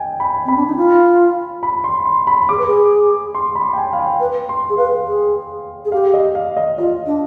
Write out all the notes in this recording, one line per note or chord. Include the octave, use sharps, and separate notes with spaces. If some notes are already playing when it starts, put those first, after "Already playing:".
Already playing: D#5 G5 G#5
B5
C4 B5
D4
D#4
F4
B5
C6
C6
B5
G#4 D6
B4
G#4
C6
B5
G5
G#5
F5
G5
B4
C6
G#4
B4 F5
G#4
G#4
G4 F5
D#5
F5
D#5
F4 D#5
D4